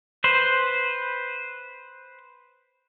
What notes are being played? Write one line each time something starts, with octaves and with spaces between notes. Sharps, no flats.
B4 C5